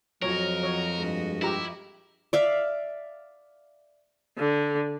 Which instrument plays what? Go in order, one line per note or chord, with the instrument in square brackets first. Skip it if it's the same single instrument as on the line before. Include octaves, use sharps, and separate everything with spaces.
[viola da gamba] F2 F#4 D#5 [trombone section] F3 F#3 [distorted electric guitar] A#4 [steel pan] C#5
[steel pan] C#5
[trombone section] G2 G#3
[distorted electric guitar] E4 [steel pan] F4 G4 A#5
[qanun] D5 E5 F5
[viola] D3